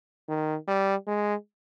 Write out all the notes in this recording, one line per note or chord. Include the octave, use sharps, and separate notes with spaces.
D#3
G3
G#3